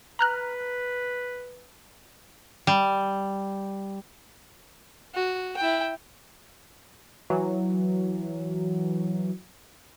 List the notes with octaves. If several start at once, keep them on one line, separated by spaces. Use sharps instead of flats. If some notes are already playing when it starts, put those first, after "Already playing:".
B4 A#5 F6 F#6
G3
F#4
E4 G5
E3 F#3